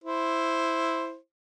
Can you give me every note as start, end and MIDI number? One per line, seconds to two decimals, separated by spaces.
0.04 1.16 64
0.04 1.16 72